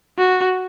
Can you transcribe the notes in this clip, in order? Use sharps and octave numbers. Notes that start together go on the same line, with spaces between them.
F#4